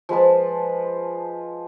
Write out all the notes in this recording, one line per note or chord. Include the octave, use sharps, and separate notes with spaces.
F3 G#3 B4 A5